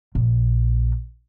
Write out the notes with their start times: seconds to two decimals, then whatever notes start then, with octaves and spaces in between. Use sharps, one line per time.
0.15 A#1